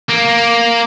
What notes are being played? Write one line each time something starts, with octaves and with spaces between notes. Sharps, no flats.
A#3